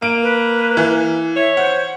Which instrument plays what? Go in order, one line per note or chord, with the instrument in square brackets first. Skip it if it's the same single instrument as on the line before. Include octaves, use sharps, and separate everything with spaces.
[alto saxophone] A#3 [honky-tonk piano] D7
[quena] B4
[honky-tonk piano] E3
[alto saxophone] C#5 [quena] E5
[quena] C5 [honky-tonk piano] F#5